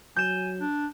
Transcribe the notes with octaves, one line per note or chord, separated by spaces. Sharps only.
F#3 G#5 G6 E7
D4